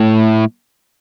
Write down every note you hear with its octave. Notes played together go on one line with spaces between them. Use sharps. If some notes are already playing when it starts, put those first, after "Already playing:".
Already playing: A2